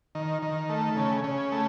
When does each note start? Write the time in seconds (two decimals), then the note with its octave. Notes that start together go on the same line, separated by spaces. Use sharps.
0.15 D#3
0.42 D#3
0.70 A3
0.96 C#3
1.24 C#3
1.52 A3